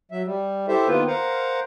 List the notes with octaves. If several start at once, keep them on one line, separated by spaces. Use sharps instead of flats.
F#3 E5
G3
E4 G4 A4 C5 E5
D#3 A#3 B3 F4 B4
A#4 C5 F5 F#5 A#5